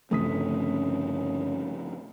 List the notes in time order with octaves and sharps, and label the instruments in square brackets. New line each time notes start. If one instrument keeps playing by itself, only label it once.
[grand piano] G1 D#6 B6 [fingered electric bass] C#3 F3 C4 [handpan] A3 [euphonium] C#4